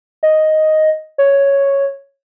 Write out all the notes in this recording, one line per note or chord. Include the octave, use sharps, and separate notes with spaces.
D#5
C#5